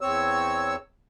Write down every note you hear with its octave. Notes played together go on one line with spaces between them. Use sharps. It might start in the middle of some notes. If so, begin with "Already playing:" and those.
E2 C4 C#5 E6